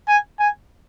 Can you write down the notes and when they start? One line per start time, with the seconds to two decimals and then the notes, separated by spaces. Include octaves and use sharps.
0.08 G#5
0.39 G#5